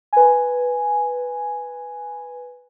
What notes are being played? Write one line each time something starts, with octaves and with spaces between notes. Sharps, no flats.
B4 G#5